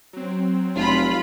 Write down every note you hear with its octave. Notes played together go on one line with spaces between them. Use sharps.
F#3 C4
F1 F4 B5